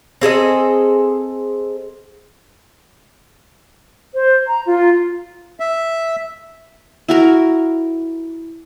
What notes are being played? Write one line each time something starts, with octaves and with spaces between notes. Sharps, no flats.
C4 G#4 A4 D#5
C5
A#5
F4
E5
E4 F#4 A#4